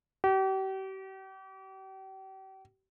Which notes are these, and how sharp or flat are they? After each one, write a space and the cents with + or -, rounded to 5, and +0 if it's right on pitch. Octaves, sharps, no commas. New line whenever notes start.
G4 -40